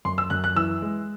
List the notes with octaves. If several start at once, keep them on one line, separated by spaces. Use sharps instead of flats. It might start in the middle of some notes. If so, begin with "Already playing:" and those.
F#2 C6
E6
F#2 F#6
F#6
E3 E6
G#3